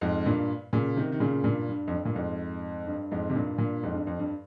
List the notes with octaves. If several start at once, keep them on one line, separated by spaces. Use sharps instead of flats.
F2 G#2
G2 A#2
A#2 C#3
C3 D#3
D#3
A#2 C#3
G2 A#2
G2
F2
G2
A#2
F2 G#2
G2
F2 G#2
C3
G2 A#2
G2 A#2
F2 G#2
G2
F2
G2